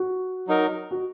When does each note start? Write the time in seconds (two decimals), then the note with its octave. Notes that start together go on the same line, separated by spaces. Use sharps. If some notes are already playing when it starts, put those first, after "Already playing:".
Already playing: F#4
0.48 F#3 D#4 A#4
0.91 F#4